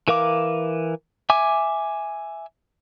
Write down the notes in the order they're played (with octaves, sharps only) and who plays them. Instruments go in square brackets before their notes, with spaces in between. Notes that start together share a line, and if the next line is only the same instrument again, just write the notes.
[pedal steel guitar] E3 A#4 F5 D6
E5 G#5 D6